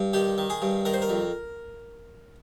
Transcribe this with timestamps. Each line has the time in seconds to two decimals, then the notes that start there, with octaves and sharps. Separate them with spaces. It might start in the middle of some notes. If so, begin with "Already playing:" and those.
Already playing: G2
0.13 D#3 G4
0.38 D#3
0.50 G#4
0.62 G2
0.85 D#3 A#4
0.94 C5
1.02 A#4
1.09 F2